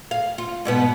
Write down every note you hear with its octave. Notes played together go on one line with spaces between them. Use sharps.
F5
F4
G#2 B2 B3